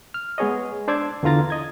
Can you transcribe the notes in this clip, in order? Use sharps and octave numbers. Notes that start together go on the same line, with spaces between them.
F6
G#3 B3 G#4 C#5 D#5
D4 C5 D5 D6 E6 G#6
E2 D3 E3 F4 A#5 A6
D#5 G#6